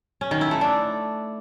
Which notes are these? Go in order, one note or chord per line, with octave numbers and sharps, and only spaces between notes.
C#4
D#3
E4
A3
D4